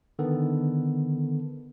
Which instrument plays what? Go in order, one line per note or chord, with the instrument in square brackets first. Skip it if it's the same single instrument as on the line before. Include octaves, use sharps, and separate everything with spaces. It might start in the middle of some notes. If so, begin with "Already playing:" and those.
[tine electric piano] D3 D#3 B3 A4